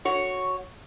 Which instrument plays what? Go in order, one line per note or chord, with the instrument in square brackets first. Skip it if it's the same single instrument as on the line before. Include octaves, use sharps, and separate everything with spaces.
[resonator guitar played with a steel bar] F#4 C#5